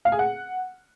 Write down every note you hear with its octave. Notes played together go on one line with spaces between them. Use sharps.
F5
G#4
F#5